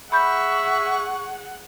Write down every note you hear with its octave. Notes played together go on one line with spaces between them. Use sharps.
G#4 E5 F#5 B5 C#6 G6